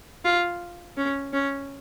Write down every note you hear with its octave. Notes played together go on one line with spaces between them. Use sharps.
F4
C#4
C#4